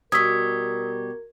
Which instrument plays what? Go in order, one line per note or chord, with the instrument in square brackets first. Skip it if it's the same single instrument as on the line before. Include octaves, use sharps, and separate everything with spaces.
[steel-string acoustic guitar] B2 G3 [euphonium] A#4 [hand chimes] C#6 G#6 [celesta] D#6 E6 B6